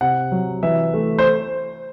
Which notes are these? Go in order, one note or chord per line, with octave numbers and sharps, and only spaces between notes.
C3 F#5
F#3
E3 E5
A3
C5